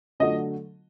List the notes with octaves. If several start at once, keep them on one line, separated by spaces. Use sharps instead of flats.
D3 F#3 A3 D#5